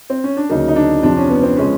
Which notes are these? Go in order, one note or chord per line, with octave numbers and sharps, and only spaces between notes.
C4
C#4
D4
D2 C#3 F#3 A#3 D#4
D#4
D4
F2 C3 F3 D4
C#4
B3
C4
C#3 F3 G#3 B3 C#4